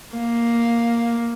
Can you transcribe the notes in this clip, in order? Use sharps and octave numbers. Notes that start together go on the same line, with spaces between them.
A#3